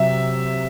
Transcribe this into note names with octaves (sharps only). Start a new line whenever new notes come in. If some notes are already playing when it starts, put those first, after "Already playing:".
Already playing: C3 F#3 E5